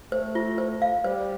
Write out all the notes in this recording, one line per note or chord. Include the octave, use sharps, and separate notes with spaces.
A3 C5
F4
C5
F5
G3 C5